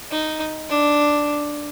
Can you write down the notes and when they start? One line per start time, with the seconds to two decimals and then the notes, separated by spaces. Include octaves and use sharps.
0.11 D#4
0.69 D4